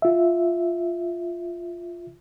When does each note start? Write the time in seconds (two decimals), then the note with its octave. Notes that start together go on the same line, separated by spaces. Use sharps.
0.02 F4 E5